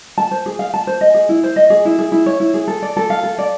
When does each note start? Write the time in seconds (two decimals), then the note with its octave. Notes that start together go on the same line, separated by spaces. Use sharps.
0.18 A5
0.31 C5
0.46 G#4
0.59 F5
0.74 A5
0.87 C5
1.01 D#5
1.14 G#4
1.29 E4
1.43 C5
1.56 D#5
1.70 G#4
1.85 E4
1.99 G#4
2.12 E4
2.26 C#5
2.40 E4
2.54 G#4
2.68 A4
2.82 D5
2.97 A4
3.10 F5
3.23 A4
3.38 D5